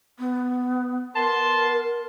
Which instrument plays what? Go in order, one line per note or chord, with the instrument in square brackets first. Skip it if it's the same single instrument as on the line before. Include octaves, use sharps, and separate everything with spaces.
[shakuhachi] B3
[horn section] B3 A5 C6 [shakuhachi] A#4